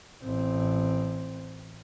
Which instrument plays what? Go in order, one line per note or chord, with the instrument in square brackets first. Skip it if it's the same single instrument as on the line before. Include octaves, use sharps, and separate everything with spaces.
[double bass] A1 C4